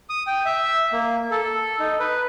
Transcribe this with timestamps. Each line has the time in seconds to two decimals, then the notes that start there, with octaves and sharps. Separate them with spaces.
0.10 D#6
0.27 G5
0.45 E5
0.93 A#3
1.31 A4
1.79 D#4
1.99 B4